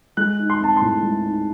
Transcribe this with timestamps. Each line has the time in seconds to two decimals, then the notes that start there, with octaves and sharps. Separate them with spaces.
0.17 G#3 F#6
0.39 D#4
0.50 C6
0.60 C4 A5
0.76 C6
0.81 A2
1.02 G#3
1.24 D#4